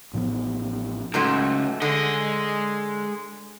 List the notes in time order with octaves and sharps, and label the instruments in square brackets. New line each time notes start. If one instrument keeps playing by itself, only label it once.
[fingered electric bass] A1 A2 F3 B3
[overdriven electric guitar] C#2 [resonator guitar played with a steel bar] G#2 F#3 A3
[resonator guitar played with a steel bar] D3 [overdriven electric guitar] G#3 D#5